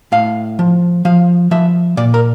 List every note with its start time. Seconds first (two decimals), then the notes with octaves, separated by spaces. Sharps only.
0.12 A2 F5
0.59 F3
1.05 F3 F5
1.51 F3 E5
1.97 A#2 D5
2.14 A#4